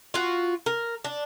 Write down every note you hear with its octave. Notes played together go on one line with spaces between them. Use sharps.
F4 F#4
A#4
D4